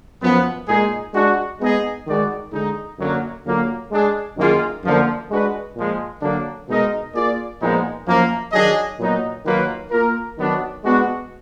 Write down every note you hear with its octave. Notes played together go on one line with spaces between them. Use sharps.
F#2 F3 B3
A#2 G#3 D#4 G#4
G#3 D4 F#4
G#3 B3 D#4 G#4 D#5
D#3 G#3 D#4 F#4 D5
D3 G#3 D#4
F#2 D3 F#3 A#3
D3 F#3 A#3 F4
G#3 D4 G#4
F#2 D#3 A#3 F4 G#4
F#2 D3 F3 A#3
G#3 D4 F#4 B4
A#2 F3 G#3
D3 F#3 A#3 D4
B2 G#3 D#4 A#4 D#5
A#3 F4 G#4 D5
A#2 F3 G#3 B3 D#4
F#2 F3 A#3
D#3 F#3 D4 G#4 D#5
A#2 F#3 B3 D#4
D#3 F#3 A#3 F4 B4
A#3 F4 A#4
D#3 F#3 B3 D4 F#4
G#3 B3 D4 F#4